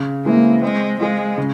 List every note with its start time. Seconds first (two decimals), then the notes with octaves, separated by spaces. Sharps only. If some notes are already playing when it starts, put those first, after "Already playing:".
Already playing: C#3
0.25 E3 G#3 A#3 C4 E4
0.62 G#3 C4
1.00 G#3 F4 G#4
1.38 C#3